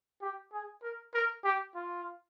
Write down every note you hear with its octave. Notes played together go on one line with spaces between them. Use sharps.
G4
G#4
A#4
A#4
G4
F4